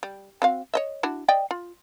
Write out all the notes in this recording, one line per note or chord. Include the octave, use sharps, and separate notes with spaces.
G3
C4 F#4 F5
C#5 D#5 E5
D4 E4 F#4
D5 D#5 G5
F4